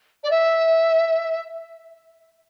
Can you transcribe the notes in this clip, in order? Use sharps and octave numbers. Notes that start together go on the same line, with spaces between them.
D5
E5